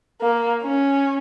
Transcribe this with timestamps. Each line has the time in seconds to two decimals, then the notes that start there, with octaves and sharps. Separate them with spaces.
0.21 A#3
0.63 C#4